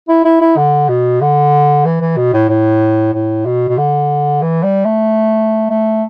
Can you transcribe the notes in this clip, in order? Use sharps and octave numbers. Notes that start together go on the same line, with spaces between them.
E4
E4
E4
D3
B2
D3
E3
E3
B2
A2
A2
A2
B2
B2
D3
E3
G3
A3
A3